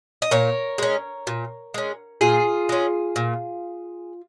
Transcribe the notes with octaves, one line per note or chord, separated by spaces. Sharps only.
D#5
A#2 A#4 C#5
G#3 C#4
A#2
G#3 C#4
A#2 F4 G#4
G#3 C#4
A#2